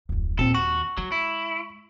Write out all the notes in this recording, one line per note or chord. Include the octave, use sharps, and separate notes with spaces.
D1 F2
D#2 A#2 C4 A4
F#4 C#6
F#3 G#3
E4